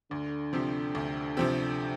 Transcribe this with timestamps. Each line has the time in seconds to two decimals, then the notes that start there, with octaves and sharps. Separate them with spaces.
0.11 D2 D3
0.53 C3 F3 C4 G4
0.95 D2
1.37 C3 F3 C4 G4